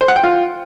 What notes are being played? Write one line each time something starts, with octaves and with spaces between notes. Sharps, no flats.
C5
F#5
G5
F4